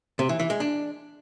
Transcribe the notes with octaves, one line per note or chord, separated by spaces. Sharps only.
C3
E3
E3
G#3
D4